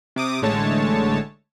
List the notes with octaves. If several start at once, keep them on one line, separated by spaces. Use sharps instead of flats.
C3 D6 D#6
A1 D3 G#3 A3 C#5 A5